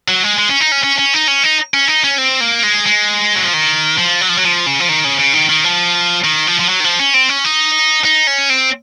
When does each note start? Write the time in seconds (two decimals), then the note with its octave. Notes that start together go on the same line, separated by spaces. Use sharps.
0.08 F#3
0.23 G#3
0.38 G#3
0.49 C#4
0.60 D#4
0.72 C#4
0.84 C#4
0.98 C#4
1.14 D#4
1.28 C#4
1.43 D#4
1.74 C#4
1.88 D#4
2.04 C#4
2.18 C4
2.41 A#3
2.63 G#3
2.86 G#3
3.35 F#3
3.44 F3
3.53 D#3
3.99 F3
4.21 F#3
4.29 F3
4.37 F#3
4.44 F3
4.67 C#3
4.80 F3
4.89 D#3
5.04 C#3
5.19 C#3
5.33 D#3
5.49 D#3
5.64 F3
6.24 D#3
6.47 F3
6.59 F3
6.69 F#3
6.80 D#3
6.84 F3
7.00 C#4
7.14 C4
7.29 C#4
7.45 D#4
8.05 D#4
8.27 C#4
8.50 C4